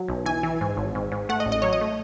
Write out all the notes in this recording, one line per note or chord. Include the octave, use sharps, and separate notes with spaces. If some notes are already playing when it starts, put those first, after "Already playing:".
Already playing: F#3
B1
E3 G#5
E3
G#2
G#1
G#2
G#2
A3 F#5
D#5
A1
D#5
F#3 C#5
D#5
A3